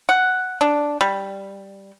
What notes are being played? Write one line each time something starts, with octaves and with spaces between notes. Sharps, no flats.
F#5
D4
G3